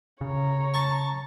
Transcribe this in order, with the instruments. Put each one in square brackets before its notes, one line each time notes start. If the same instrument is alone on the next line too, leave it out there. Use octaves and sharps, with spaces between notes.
[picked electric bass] C#3 [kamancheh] C#5 A#5
[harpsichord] A5 C#6